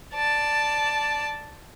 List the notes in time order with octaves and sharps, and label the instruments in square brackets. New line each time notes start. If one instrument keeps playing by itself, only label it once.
[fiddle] D5 A5